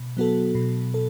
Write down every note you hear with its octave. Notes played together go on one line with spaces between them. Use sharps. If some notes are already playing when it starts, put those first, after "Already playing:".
Already playing: B2
F#3 B3 F#4 A4
B2
A4